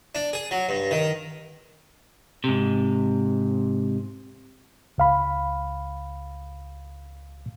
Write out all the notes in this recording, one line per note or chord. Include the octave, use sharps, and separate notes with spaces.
D4
G#4
F#3
G2
D#3
G#2 C3
C#2 F5 B5